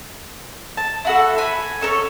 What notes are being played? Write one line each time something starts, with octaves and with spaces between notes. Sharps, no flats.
A5
E4 F#4 A4
G#5 B5
C#4 A4 A#4 C#5